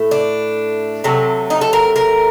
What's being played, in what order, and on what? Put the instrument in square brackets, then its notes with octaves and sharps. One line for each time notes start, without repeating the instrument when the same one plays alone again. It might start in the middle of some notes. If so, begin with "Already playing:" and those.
Already playing: [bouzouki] A2 A3
D4
C3 F#3 A3
D#4
A4
A#4
A#4